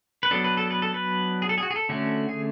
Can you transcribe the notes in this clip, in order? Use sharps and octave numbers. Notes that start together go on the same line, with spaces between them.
B4
F#3 B3 D4 A4
B4
A4
B4
A4
B4
G#4
A4
G#4
F#4
G#4
A4
D3 A3 C#4 F#4
G#4